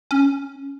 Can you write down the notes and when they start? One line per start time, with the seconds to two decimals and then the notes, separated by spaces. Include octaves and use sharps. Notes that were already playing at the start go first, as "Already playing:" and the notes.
0.11 C#4